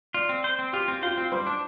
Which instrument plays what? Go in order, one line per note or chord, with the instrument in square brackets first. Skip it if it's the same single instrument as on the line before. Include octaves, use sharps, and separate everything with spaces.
[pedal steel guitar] F4 [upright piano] D5
[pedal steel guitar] C4
C5
C4
[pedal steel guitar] F4 [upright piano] G4 G5
[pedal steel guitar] C4
[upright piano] F4 F5 [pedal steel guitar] C5
[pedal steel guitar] C4
[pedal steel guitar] G3 [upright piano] C5 C6
[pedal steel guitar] D4